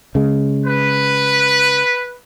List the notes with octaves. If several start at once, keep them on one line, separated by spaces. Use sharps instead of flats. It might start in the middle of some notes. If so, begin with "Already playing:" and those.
C#3 G#3
B4